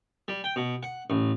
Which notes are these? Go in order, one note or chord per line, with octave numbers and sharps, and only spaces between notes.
G3
G5
B2
F#5
A1